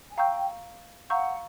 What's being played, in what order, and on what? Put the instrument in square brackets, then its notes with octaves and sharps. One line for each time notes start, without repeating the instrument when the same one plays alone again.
[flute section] G#5
[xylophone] F5 A#5 C#6 E6 G6 [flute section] G5
[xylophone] F5 A#5 C#6 E6 G6 [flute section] F#5